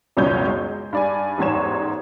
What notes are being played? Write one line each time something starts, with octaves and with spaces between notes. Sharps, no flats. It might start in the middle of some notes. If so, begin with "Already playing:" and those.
G#1 C#2 F#2 B2 C#4 G6
G#3
G2 D5 G#5
A1 E2 G#2 C#5 G#6 E7